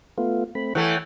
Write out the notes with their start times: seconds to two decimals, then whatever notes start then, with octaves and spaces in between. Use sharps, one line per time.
0.18 A3 B3 F4
0.55 A3 C4 B5
0.75 E3 A3 C#5 F#5 G5